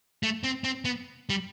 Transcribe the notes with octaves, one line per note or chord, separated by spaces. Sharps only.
A3
C4
C4
B3
G3